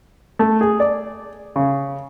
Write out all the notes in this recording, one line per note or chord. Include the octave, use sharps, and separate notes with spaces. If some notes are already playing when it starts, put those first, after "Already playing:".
A3
G#4
D5
C#3